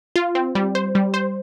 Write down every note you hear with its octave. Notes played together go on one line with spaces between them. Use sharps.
F4
C4
G3
C5
G3
C5